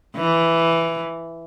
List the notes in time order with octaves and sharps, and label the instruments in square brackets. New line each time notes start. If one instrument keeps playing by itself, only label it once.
[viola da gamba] E3